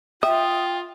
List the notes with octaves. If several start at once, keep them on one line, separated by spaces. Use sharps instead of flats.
F4 E5 G5 D#6